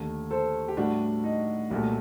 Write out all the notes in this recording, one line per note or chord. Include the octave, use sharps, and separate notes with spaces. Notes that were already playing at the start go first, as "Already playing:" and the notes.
Already playing: D#2 D3 A3
A4 C5
G4
A2 G3 D4 F#4
D#4
C2 A#2 F#3 A3